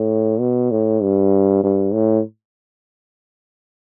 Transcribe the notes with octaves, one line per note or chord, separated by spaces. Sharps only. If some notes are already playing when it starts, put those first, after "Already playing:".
Already playing: A2
B2
A2
G2
G2
A2